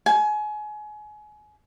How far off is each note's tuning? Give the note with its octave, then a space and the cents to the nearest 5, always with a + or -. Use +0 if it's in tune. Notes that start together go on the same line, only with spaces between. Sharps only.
G#5 +30